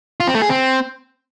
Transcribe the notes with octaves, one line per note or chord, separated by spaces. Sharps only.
F4
C4
A3
G#4
C4